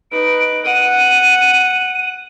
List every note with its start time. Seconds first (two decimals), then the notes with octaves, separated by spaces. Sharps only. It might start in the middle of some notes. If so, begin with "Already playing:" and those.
0.12 D#4 B4 D7
0.65 F#5 D#7